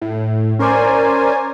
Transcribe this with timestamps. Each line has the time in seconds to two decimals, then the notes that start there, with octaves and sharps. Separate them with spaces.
0.02 A2
0.59 C#4 A#4 C5 D5 G#5